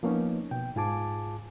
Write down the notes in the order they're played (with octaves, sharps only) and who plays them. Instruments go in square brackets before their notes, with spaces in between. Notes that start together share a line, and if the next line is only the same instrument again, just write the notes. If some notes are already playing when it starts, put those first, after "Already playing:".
[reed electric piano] F3 A#3 B3 C#4 D#4
B2 G5
G#2 F4 G#4 G#5 A5 D6